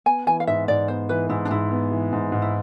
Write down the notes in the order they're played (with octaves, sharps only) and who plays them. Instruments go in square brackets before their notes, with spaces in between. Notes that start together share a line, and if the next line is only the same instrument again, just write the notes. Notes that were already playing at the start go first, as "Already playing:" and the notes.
[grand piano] B3 [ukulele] G#5
[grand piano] E3 [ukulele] G#5
[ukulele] F5
[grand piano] G#2 [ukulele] E5
[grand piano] G#2 [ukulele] D5
[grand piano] B3 [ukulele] C5
[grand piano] E3 [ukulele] B4
[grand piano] G#2 [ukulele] E4
[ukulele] D4
[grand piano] G#2 [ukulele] E4
[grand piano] B3
E3
G#2
G#2
[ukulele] E4